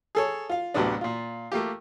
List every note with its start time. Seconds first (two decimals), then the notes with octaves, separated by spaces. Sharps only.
0.15 G#4 A4 C#5
0.50 F4 F5
0.74 A1 D2 C3 F#3 B3 D4
1.01 A#2 F4
1.52 A3 A#3 F4 G4